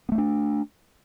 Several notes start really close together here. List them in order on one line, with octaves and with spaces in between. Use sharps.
B3 A3 C#4 D4